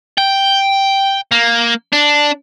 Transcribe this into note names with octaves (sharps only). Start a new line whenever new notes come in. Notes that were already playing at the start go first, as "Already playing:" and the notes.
G5
A#3
D4